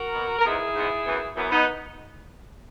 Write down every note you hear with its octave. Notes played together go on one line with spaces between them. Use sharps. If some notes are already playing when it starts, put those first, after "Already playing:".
Already playing: F#4 A#4
B2 A#3
A#4
G#2 E3 G#3 B3 E4 G#4
G#2 E3 G#3 B3
F#2 E3 B3
F#2 E3 B3
B3 D#4